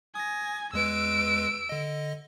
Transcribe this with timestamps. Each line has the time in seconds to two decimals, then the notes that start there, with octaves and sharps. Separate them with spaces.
0.15 G#5 D#6 A#6
0.73 E2 G#3 B4 E6 D7
1.69 D3 D#5